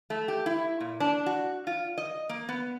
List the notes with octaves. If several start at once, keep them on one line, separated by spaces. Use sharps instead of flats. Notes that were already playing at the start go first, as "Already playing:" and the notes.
A3
G4
E4
A#2
D4
F#4
F4
D#5
A#3
B3